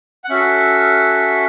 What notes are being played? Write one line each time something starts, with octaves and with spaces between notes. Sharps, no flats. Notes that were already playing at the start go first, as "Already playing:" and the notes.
F#5
C#4 F#4 A4 E5